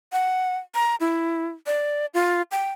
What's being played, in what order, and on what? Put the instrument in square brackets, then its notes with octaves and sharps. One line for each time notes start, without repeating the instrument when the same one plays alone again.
[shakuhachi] F#5
A#5
E4
D5
F4
G5